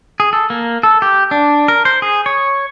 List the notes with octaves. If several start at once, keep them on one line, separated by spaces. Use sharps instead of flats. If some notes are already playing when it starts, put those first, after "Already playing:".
G#4
A4
A#3
A4
G4
D4
A#4
C5
G#4
C#5